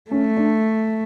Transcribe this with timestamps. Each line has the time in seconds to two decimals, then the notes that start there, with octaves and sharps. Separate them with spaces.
0.11 A3 C#4
0.37 D4